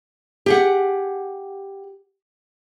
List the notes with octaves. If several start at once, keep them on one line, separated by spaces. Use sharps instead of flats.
G4 G#4 F#5